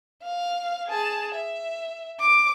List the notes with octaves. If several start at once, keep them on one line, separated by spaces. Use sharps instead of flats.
F5
G#4 A5
E5
D6